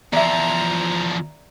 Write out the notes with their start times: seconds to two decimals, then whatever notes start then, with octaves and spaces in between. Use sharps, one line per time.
0.13 E2 F3 D5 E5 A#5